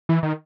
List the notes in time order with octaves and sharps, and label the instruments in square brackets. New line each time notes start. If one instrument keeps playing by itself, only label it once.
[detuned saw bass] E3
D#3